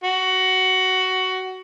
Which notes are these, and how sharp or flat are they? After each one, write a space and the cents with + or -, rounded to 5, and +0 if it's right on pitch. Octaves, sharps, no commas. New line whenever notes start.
F#4 +15